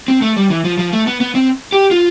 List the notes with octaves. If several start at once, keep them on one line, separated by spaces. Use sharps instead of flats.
C4
A3
G3
E3
F3
F3
A3
B3
B3
C4
G4
F4